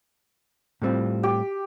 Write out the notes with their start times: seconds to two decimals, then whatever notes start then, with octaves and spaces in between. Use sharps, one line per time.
0.82 A2 G3 C4 F4
1.23 G4